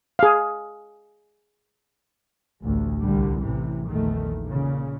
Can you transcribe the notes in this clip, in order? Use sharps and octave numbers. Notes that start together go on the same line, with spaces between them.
G#4 F5
A1 D2
C2 D3 G3
A1 C3 E3
A#1 E2 D#3 A3
A#2 C#3